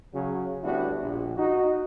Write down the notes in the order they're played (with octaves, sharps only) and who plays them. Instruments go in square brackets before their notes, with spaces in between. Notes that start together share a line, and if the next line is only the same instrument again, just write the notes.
[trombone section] C#3 F#3 F#4
D2 G3 B3 D4 E4 F#4
A#1
D#4 F#4